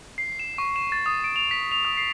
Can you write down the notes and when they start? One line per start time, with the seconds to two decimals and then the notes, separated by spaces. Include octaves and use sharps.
0.18 C7
0.39 E7
0.58 C#6
0.76 E7
0.92 A6
1.06 D#6
1.24 D7
1.36 F7
1.51 B6
1.72 F7
1.85 D#6
1.97 C7